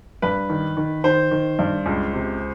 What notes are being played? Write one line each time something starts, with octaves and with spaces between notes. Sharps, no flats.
G2 B4
D#3
D#3
D#3 C5
D#3
G2
C#2
C3